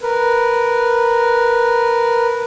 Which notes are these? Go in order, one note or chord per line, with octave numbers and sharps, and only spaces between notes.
A#4 B4